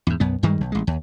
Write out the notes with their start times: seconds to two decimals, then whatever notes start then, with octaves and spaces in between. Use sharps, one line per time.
0.07 E2 G#2
0.20 B1 F#2 B3
0.43 G2 D#3 G3 G#3
0.61 B1
0.72 A1 G#3
0.87 D#2